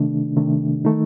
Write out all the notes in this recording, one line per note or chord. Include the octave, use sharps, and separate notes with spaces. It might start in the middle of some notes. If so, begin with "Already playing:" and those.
Already playing: C3 D#3 A3 D4
C3 D#3 A3 D4
D#3 A3 D#4